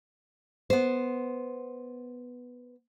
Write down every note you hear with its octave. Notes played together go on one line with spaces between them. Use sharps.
B3 C5